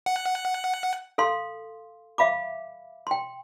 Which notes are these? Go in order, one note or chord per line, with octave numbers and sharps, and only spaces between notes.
F#5
A4 F5 C6
E5 F5 B5 D6
G5 C6